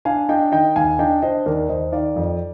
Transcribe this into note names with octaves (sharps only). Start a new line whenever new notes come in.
D4 F5 G#5
D4 D#5 G5
D#3 D#5 G5
D#2 F5 G#5
D4 D#5 G5
D4 C5 D#5
D#2 A#4 D5
D#2 C5 D#5
D#3 D5 F5
F2